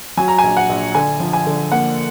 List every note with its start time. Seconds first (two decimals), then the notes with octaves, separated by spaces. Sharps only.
0.17 F#3 G#5
0.28 A#5
0.38 G#5
0.44 A#1
0.57 F#5
0.69 A#1
0.95 D3 G#5
1.20 F3
1.33 G#5
1.47 D3
1.72 A#3 F#5